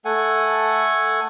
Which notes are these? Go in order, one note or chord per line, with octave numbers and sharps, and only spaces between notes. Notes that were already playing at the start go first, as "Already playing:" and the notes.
A3 A4 F#5 G#5